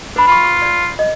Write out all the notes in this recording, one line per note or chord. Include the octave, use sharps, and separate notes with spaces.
D4 B4 B5
F4 B5 C#6
C#6
D5
D#5